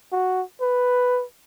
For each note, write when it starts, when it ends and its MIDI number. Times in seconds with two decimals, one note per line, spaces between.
0.12 0.43 66
0.61 1.24 71